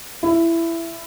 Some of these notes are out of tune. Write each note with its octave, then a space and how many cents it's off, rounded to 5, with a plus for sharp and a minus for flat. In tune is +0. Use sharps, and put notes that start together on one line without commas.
E4 +15